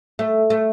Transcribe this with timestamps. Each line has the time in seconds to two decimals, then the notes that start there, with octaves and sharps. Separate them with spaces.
0.19 A3
0.50 A3